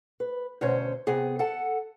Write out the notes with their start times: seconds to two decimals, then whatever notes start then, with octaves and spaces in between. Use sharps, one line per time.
0.20 B4
0.61 D2 B2 C#4 C5 C#5
1.07 C3 B3 G#4
1.39 A4 F#5 A5